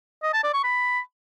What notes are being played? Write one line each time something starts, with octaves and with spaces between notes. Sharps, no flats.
D#5
A5
D5
C#6
B5